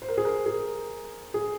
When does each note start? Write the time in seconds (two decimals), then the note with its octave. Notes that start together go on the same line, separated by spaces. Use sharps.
0.02 C5
0.08 A#4
0.17 G#4
0.25 A#4
0.46 G#4
1.34 G#4